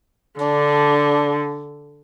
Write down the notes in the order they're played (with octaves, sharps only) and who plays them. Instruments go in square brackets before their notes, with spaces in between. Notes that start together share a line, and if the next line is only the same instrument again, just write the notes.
[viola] D3 [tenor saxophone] D4